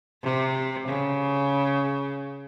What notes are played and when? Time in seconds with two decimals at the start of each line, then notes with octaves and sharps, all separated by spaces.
0.24 C3
0.88 C#3